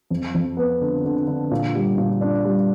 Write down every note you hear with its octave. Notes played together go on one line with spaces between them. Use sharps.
F2
F2
B3
D3
D3
D3
A#2
G3
A#2
D4
G3